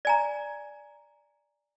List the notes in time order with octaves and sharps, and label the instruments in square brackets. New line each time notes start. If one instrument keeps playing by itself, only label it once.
[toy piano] D5 G#5 A#5